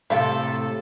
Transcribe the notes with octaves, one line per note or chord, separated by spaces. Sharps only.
A2 C3 A4 E5 F5 G5